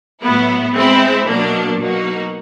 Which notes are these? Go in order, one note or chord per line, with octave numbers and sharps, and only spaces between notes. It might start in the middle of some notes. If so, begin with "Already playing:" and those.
A2 F#3 B3 E4
G#3 C4 E4
B2 F#3 A#3 D4
B2 F#3 A#3 D#4 F#4